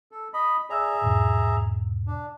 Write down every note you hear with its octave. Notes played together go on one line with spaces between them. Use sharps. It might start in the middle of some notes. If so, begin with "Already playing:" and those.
A4
D#5 B5
G#4 D5 E5 A#5 E6
E2 G#2 B2
D4